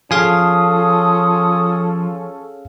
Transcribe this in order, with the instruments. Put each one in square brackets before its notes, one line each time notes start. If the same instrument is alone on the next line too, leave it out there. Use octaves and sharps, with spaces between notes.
[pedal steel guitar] F3 [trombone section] C#4 A4 [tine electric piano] G#4 F5 G#5 [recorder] D#6